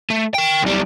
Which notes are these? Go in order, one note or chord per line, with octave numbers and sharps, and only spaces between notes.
A3
A#4 G5
B1 G3